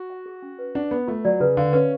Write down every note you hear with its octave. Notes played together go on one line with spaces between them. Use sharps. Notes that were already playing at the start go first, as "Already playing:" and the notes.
Already playing: F#4
F#5
G#4
C#4
B4
D4 F#5
B3 B4
A3 F4
F#3 D5
C#3 B4
D3 F5
C#4 B4